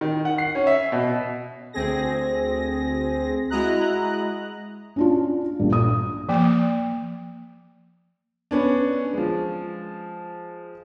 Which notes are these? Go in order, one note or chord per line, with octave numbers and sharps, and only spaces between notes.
D#3
F#5
C7
C#4
E5
B2
D2 C4 G#4 A#6
G#3 E4 F#4 D#5 A#5 F#6
C#4 D4 F4
A#1 G2
D#6
F3 A#3
B3 C#4 D4
F3 G#3